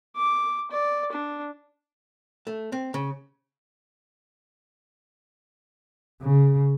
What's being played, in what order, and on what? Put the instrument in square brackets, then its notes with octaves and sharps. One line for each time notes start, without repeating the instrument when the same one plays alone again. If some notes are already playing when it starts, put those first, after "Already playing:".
[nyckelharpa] D6
D5
D4
[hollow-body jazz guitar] A3
C4
C#3
[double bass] C#3